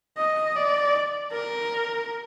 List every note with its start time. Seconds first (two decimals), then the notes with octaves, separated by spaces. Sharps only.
0.18 D#5
0.56 D5
1.32 A#4